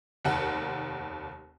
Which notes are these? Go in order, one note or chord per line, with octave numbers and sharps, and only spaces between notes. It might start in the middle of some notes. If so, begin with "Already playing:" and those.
F1 D#2 F#5